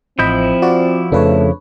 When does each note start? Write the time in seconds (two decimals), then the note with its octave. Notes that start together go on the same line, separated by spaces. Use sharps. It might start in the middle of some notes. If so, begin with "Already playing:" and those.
0.19 A1 F3 C4 E4 D#5 B5 G6
0.62 F4 F#4 D5
1.12 F2 C#3 A3 D4 B4 C#5